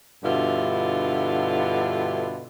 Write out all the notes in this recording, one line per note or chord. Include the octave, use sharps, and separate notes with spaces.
G2 B2 D3 E4 F4